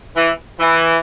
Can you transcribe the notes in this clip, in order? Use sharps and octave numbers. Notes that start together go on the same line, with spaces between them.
E3
E3